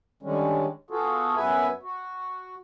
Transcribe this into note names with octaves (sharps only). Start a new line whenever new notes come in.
D3 D#3 G3 G#3 C#4
B3 F4 F#4 G#4 A4
F#2 B3 B4 E5 G#5
F#4